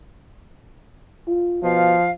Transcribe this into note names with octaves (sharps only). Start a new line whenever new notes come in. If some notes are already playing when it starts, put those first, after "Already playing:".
F4
B2 F3 F5